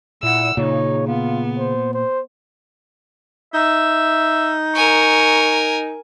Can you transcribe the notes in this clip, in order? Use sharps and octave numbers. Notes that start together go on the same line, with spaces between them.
A#2 E4 F#5 E6
A#2 C#3 D#4 C#5
B3 F4
C5
C5
D#4 E5
A#4 G#5 C#6